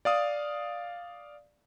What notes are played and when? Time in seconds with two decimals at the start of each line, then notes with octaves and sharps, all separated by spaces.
0.05 D5 F5 D#6